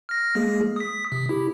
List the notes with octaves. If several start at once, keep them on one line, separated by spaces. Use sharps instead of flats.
F6 A#6
G#3 A#3 G#4
D#6 B6
C3
E4 G4